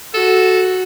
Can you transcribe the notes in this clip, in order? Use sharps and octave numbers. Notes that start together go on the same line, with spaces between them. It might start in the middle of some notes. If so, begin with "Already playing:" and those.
F#4 A4